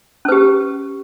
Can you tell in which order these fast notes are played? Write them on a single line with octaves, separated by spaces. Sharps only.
C#4 B4 G4